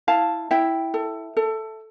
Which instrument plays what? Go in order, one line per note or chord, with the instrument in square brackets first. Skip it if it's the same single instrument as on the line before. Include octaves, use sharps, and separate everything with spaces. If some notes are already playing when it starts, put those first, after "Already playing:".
[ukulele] E4 F5 A5
E4 E5 G5
A4
A4